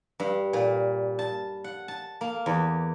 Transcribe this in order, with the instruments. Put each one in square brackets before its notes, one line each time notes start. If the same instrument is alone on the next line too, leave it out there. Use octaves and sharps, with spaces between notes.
[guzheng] G2
A#2
A5
F#5
A5
A#3
E2